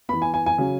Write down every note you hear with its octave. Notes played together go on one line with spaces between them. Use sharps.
E3 B3 B5
G#5
G#5
G#5
C#3 F#3 C#4